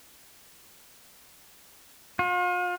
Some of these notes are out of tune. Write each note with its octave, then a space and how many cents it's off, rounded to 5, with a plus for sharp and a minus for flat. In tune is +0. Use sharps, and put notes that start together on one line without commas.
F4 +40